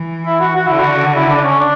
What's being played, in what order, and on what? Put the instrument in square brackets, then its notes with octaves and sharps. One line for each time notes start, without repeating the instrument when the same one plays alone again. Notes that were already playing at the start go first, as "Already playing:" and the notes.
Already playing: [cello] E3
[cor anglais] E4
F#4
F#4
[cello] D3 [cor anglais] E4
[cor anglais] F#4
E4
D4
C#4
D4